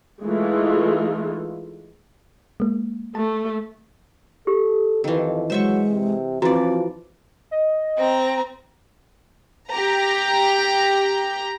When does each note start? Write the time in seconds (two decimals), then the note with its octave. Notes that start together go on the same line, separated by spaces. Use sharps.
0.24 E3 G#3 A3 D#4 F4
2.60 G#3 A#3
3.15 A3 A5
4.47 G4 A4
5.04 F2 D#3 E3
5.50 F#3 G#3 C5 E5 C#6
5.88 C3
6.42 E3 F3 C4 F#4 D5 A#5
7.51 D#5
7.97 C4 A#5
9.71 G4 A#5